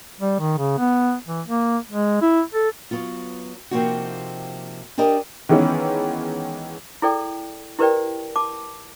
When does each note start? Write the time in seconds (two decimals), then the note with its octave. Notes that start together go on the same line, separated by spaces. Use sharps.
0.20 G3
0.39 D#3
0.58 C#3
0.78 B3
1.27 E3
1.47 A#3
1.89 G#3
2.22 E4
2.54 A4
2.91 F#3 B3 F4
3.71 C3 F3 A#3 C4 D#4 F#4
4.98 D4 G4 A#4 D#5
5.49 D#3 E3 G#3 B3 C#4
7.02 E4 G#4 A4 D5 G5
7.79 E4 G4 A#4 B4 D5 G5
8.36 A5 D6